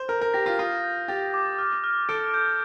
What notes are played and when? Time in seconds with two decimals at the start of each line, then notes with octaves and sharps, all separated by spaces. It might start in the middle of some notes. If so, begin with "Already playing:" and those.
Already playing: C5
0.08 A#4 G6
0.22 A#4
0.34 G4 A#6
0.46 F4
0.59 F4 D#6
0.84 G6
1.08 G4 A6
1.34 D6
1.58 F6
1.84 F6
2.09 A4 D7
2.34 G6